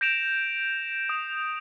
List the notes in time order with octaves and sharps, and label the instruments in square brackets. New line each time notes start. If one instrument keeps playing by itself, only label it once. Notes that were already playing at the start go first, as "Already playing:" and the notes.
[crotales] G6 A#6 D7 E7 F7
D#6